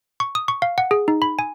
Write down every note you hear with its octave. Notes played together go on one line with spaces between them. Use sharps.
C#6
D#6
C#6
F5
F#5
G#4
D#4
B5
G#5